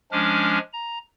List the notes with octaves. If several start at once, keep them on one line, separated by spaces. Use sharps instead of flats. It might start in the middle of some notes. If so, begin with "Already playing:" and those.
F3 G#3 C#4 D4 D6 F6
A#5